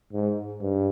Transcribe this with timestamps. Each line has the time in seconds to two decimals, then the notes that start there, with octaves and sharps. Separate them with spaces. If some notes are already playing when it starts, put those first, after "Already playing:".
0.13 G#2
0.61 G2